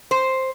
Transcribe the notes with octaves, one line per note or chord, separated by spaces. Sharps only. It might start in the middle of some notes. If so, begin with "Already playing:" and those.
C5